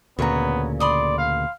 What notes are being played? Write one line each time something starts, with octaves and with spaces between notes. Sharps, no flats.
D2 A#2 C#3 B3 C#5 A#5
D5 B5 C6 D#6
F5